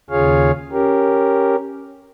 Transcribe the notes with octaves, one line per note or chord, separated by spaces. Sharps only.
D#2 C#3 F4 G#4 C#5 F5
C#4 G4 A#4